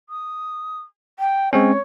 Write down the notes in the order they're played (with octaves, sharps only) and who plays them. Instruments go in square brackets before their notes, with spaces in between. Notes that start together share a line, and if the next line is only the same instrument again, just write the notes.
[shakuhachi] D#6
G5
[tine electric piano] G#3 C4 C#4 [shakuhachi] C#5